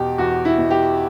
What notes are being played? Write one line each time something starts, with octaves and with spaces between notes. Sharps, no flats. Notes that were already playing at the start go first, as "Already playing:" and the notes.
Already playing: E2 B2 G4
E2 F#4
E4
B2
G4